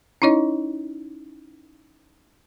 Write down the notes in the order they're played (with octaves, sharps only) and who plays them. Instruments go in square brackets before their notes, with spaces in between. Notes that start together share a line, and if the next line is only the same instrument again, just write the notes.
[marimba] C#4 D#4 E4 C#5 D#5